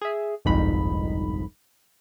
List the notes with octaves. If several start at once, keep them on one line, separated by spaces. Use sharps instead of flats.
G#4 E5
G1 C2 F2 G#2 D#4 B5